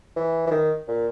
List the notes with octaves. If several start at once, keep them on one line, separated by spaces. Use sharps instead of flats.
E3
E3
D#3
A#2